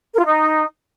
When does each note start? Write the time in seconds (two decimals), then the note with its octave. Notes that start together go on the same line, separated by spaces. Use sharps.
0.14 A#4
0.19 F4
0.25 D#4